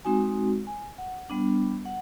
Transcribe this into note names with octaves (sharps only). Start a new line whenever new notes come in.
G#3 C4 D#4 F#4 G#5
G#5
F#5
G3 B3 D4
F#5